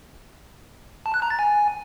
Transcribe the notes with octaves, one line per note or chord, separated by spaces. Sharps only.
A5
F#6
A#5
A6
G#5